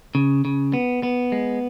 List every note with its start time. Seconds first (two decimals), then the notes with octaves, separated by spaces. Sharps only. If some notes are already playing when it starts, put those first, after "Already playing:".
0.15 C#3
0.45 C#3
0.74 B3
1.03 B3
1.32 G#3